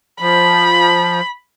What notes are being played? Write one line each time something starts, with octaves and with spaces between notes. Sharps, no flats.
F3 B5